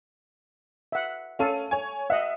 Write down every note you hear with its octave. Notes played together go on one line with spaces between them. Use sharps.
E5 F#5
C#4 A4 F5 D#7
C#5 G#5
D#5 E5 F#5